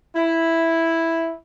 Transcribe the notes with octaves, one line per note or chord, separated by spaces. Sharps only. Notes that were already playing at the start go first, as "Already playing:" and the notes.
E4